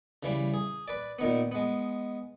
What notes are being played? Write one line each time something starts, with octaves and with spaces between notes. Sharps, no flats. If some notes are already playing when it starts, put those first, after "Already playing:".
C#3 E3 G3
G#4
B4 D5
A#2 D#3 B3
G#3 B3